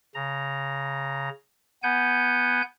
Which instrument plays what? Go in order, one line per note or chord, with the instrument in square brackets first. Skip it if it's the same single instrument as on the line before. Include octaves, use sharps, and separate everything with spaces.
[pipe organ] C#3 A#5
B3 F#5 G#5 G6